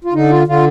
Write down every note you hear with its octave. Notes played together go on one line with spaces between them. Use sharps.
F4
D3 D#4
F4
D3 F4